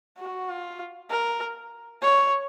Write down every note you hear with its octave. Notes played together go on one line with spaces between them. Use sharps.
F#4
F4
A#4
C#5